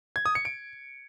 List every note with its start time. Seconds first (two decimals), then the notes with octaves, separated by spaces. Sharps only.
0.16 G#6
0.26 D#6
0.35 C#7
0.45 D7